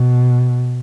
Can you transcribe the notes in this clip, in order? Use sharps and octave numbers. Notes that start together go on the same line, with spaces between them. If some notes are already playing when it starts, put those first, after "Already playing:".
Already playing: B2